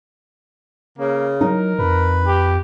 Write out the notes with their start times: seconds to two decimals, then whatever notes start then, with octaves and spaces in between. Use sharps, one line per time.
0.98 C#3 A#3
1.41 F#3 D#4 A#4
1.79 F2 B4
2.26 G4